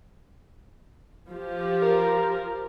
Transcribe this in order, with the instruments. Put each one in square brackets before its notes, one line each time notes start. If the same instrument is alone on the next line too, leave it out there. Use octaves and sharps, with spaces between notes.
[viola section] F3 G4
[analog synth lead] A#4